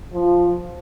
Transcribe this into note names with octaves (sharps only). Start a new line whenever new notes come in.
F3